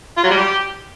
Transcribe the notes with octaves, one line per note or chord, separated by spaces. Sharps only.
F4
F#3
G3
G4